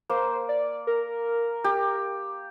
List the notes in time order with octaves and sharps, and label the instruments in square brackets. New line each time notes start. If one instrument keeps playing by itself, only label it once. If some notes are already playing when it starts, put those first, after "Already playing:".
[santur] A#3 [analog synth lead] C5
[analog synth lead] D5
A#4
[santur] G4